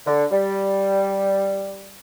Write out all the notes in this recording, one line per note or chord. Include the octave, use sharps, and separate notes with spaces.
D3
G3